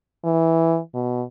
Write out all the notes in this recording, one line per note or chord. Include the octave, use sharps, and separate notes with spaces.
E3
B2